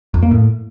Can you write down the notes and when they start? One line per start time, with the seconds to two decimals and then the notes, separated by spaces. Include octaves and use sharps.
0.14 F2
0.23 A#3
0.31 A2